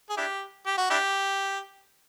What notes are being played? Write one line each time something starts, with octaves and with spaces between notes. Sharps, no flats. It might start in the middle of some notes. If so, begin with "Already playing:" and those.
G#4
D4 E4 G4
G4
F#4
D4 E4 G4